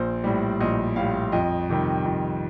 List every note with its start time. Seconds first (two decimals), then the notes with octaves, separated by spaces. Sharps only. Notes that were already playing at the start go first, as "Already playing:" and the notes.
Already playing: A#1 C5
0.24 A2 G3 D5
0.61 A#1 D#5
0.96 A2 G3 F5
1.32 F2 D#5
1.70 C3 D#3 G3
2.06 F2